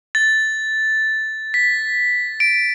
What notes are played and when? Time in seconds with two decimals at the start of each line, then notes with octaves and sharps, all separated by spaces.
0.15 A6
1.54 B6
2.40 D7